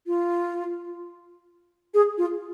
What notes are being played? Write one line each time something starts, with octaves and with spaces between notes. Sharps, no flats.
F4
G#4
F4